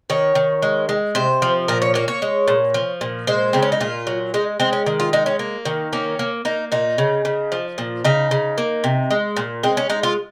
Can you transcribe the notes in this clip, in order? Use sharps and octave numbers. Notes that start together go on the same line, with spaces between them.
D#3 C#5
D#3
G#3
G#3
C3 C5
F3
A#2 A#4
C#5
A#3 C#5
C#5
G#3
A#2
F3
A#2
G#3 C5
C#3 C4
C#4
D#4
A#2 F4
F#3
G#3 D#4
G#3 C4
C#4
D#3
F4
G#3 D#4
C#4
A#3
D#3
A#3 C#4
A#3
A#3 D#4
A#2 D#4
C#3
C#3
F3
A#2
C#3 D#4
C#3
A#3
C3
G#3
A#2
G#3 C4
C#4
G#3 D#4
F4